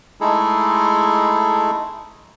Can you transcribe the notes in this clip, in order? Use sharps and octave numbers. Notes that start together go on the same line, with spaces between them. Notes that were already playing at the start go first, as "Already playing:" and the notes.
G#3 A3 D#4 E4 G#4 A4